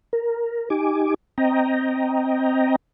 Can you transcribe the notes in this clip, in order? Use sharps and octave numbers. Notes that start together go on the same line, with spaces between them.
A#4
D#4 G4 G#5 D6
C4 D#5 G5 A#5